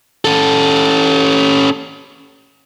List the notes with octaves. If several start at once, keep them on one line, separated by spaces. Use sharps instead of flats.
C#4 A4